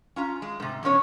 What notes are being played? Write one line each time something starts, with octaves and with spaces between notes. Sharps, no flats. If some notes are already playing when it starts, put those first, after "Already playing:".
C#4 F4 A#5
G#3
G#2 C3
E2 B2 C#4 C#5